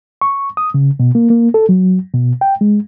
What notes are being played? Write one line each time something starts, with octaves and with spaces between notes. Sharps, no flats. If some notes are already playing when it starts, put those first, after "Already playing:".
C#6
D#6
C#3
B2
A#3
A#3
A4
F#3
B2
G5
G#3